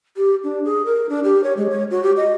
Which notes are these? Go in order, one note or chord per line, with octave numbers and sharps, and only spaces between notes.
G4
D4
G#4
A#4
D4
G4
C#5
G#3
C#5
F#4
G4
D#5